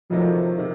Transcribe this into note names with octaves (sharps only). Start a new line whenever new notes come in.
F2 C3 D#3 F3 F#3 A3
C3 D#3